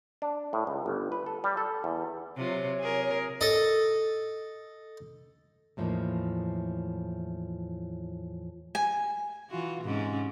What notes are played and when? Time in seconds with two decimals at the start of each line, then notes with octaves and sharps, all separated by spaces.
0.22 D4
0.53 A2
0.67 C#2
0.86 G1
1.12 B4
1.26 A4
1.44 G3
1.57 A4
1.84 E2
2.37 C3 F#3 F4 C#5
2.79 G#4 A#4
3.41 A4 D#5
5.77 E2 A2 F3 G#3 A#3 D#4
8.75 G#5
9.50 E3 F4 F#4
9.83 G#2 C3 C#4